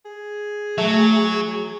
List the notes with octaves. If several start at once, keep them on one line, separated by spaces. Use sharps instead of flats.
G#4
F#3 A3